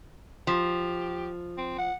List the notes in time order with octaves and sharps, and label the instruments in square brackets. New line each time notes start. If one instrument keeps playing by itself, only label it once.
[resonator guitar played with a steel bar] F3 [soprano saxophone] G4
[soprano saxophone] C4
F#5